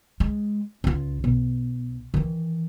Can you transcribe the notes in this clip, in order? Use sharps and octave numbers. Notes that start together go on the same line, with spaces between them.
G#3
C#2 F4
B1
D#3 E3